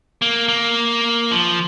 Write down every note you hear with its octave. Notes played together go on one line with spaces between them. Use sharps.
A#3
A#3
F3